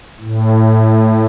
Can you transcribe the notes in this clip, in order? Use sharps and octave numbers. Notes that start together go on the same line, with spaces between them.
A2